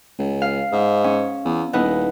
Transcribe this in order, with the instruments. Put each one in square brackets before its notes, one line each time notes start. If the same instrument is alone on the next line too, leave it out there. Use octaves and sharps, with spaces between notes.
[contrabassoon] C#2
[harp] F5
[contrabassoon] G#2
[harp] C#4
[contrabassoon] E2
[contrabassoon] D#1 [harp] B3 D#4 E4